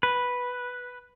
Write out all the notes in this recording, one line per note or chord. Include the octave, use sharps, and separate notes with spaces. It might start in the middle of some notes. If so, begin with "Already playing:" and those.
B4